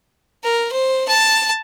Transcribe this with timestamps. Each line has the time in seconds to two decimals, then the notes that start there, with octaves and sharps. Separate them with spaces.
0.43 A#4
0.72 C5
1.08 A5